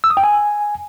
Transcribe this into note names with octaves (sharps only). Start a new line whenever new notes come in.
E6
D#6
G5
G#5